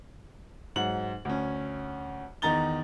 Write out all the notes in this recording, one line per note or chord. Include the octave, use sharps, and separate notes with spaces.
G#2 F#3 F#5 F#7
D2 C#4
E2 D#3 D#4 A#5 A6 G7